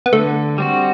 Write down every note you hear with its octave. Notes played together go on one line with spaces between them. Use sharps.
B3
D3 A3
G3 C4 F#4